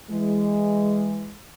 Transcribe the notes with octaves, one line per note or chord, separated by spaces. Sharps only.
E3 G#3